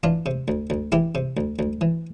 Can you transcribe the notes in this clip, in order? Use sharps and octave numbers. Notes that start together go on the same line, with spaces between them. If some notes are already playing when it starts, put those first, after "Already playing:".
E3 D4 F4
C3
D2
D2
E3 E4 G4
C3
D2
D2
E3